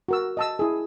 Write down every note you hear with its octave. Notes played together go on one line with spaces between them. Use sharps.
F#4 A#4 E6
D#5 A5 E6
E4 G#4